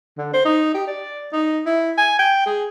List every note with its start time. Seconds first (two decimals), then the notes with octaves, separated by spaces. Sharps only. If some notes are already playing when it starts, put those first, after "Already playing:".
0.17 D3
0.33 C5
0.45 D#4
0.74 G4
0.87 D5
1.33 D#4
1.66 E4
1.97 G#5
2.19 G5
2.46 G#4